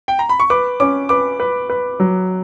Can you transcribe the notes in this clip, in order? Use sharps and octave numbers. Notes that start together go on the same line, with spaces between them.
G5
A#5
B5
C#6
B4 D6
C#4 D6
B4 D6
B4
B4
F#3